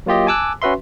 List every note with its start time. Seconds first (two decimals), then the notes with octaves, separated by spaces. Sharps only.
0.06 F#3 A#3 F4 G4 D#5
0.27 G#5 A5 D6 E6 F#6
0.62 C#4 F#4 B4 E5 C6